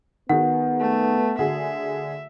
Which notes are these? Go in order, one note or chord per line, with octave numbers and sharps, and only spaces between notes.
D#3 B3 F#4 G#4 F#5
A3
D3 F#4 G#4 E5